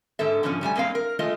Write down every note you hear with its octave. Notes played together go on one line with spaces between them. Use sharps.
G#2 D3 A4 E5
G#2 B2 D3 F3 C#4 F4
G2 G3 A3 G#5
G2 G#3 A#3 C4 F5
A#4
G#3 A3 F4 D#5